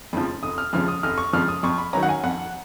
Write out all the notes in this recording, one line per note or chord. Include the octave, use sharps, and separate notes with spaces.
F2 C#3 F3
F1 D#6
F6
F2 C#3 F3 F6
D#6
F1 F6
C#6
F2 C#3 F3 F6
D#6
F2 C#6
B5
D#3 F#3 C#4 A#5
F#5
G#5
F2 F#5